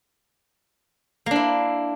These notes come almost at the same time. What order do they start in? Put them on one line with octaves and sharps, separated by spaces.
A#3 D4 E4